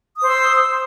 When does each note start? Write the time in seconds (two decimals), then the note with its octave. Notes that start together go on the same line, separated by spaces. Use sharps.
0.17 D#6
0.22 C5
0.26 E6